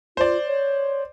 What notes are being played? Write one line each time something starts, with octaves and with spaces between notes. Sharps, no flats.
F4 C5 D5
C#5